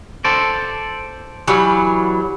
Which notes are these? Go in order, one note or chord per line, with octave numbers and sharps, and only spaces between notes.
A4 C5 D5
E3 F#3 G3